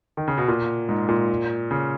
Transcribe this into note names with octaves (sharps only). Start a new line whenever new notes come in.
D#3
C#3
B2
A#2
G#2
A#2
C#3